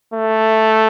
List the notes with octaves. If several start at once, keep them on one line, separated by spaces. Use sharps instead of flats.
A3